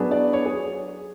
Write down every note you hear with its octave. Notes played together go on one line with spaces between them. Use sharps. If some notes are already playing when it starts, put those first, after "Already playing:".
Already playing: F#3 B3 D4 G#4 B4
D5
C#5
G#4